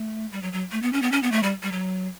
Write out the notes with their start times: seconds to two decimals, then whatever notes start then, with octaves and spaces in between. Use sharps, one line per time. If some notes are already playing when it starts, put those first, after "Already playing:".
Already playing: A3
0.32 G3
0.42 F#3
0.53 F#3
0.72 A3
0.82 B3
0.93 C#4
1.02 B3
1.12 C#4
1.23 B3
1.32 A3
1.43 G3
1.63 G3
1.72 F#3